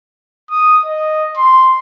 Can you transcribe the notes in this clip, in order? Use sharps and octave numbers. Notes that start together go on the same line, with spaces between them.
D#6
D#5
C6